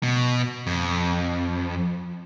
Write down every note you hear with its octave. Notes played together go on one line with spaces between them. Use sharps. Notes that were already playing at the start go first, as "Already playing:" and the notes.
B2
F2